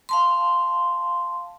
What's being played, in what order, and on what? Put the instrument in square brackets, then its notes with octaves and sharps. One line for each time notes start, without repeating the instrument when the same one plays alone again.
[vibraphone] F5 A5 C6